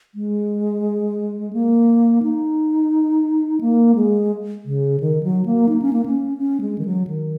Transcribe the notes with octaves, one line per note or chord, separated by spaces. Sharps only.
G#3
A#3
D#4
A#3
G#3
C#3
D#3
F#3
A#3
D#4
C#4
A#3
C#4
C#4
G#3
D#3
F#3
D#3